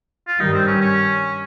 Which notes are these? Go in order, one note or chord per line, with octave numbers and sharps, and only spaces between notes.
F4
G2 D#3 G3 D#4
C4
C#4
C#4